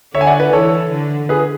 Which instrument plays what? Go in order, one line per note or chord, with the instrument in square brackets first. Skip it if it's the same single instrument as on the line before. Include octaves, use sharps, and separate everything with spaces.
[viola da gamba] D3 [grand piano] C#5 E5
[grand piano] G#5
D5 F#5
B4 D5
[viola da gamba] E3 [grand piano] A4 C#5
[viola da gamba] D3
[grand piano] G#4 B4